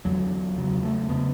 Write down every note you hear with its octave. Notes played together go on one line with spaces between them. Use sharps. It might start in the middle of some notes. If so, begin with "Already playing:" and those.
E2 D3 F#3
E2 C#3 F#3
A3
C#3 B3